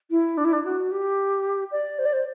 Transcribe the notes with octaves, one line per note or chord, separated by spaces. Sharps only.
E4
D4
E4
D4
F#4
G4
D5
C5
D5
C5